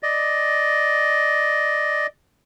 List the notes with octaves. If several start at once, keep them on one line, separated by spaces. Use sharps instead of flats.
D5 D#5